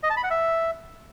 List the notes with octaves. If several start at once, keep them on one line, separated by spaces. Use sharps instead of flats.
D#5
A5
B5
F#5
E5